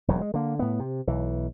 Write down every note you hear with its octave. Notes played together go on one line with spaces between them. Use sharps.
E1 D#2 F#3
G#3
D3 A#3
A2 B3
C3
B1 E3